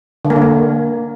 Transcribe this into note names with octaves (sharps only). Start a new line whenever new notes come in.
D3
A#3
D3
A#3